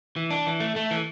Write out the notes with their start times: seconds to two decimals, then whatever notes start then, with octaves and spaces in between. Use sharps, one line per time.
0.16 E3
0.31 D4
0.47 E3
0.60 A3
0.76 A3
0.91 E3